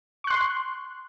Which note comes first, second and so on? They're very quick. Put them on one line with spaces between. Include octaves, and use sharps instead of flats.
C#6 F#6 C6